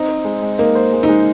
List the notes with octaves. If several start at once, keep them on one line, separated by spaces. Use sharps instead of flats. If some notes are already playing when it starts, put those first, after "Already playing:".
Already playing: C4 D#4
C5
G#3
G#3
A#3 D#4
C5
G#3
D#4
G#3